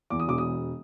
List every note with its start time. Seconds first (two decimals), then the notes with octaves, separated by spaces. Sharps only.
0.10 E2 D6
0.20 D#6
0.27 E1 D6
0.38 D#6